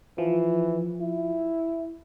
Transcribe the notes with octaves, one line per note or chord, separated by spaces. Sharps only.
E3 F3
E4